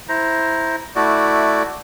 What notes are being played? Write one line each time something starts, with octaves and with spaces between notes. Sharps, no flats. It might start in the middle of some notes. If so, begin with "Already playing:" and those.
E4 C5 A#5
A3 E4 F#4 D5